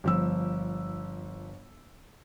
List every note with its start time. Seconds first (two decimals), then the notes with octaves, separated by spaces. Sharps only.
0.04 G1 F3 E6